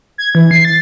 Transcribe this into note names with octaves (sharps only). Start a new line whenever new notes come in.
G#6
E3
C7
A6